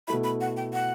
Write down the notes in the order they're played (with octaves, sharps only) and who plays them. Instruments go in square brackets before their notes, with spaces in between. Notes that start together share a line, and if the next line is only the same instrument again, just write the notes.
[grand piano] B2 A3 E4 [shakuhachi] B5
[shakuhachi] B5
F#5
G5
F#5